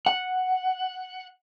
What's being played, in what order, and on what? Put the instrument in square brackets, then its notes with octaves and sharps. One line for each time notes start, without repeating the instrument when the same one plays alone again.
[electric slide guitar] F#5